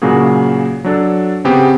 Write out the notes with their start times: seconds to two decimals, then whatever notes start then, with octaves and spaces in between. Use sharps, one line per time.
0.02 A#2 C#3 F#3 A#3 F#4 G#4
0.84 F#3 D4 A4
1.45 C#3 B3 C4 G4 G#4